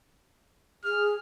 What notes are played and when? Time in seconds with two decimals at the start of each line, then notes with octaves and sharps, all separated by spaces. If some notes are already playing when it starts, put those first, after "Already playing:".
0.84 G#4 F6